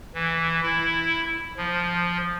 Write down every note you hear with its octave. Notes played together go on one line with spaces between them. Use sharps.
E3
E4
F3